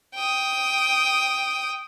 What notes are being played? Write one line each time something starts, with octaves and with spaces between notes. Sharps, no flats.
G5 D#6